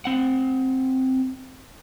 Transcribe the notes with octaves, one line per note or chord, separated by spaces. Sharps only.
C4 F#5